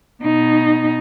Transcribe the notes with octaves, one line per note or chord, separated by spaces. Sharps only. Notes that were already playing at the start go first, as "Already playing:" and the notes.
B2 D#4